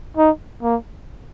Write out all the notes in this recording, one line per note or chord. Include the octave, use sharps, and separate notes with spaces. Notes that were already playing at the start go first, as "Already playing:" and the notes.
D#4
A#3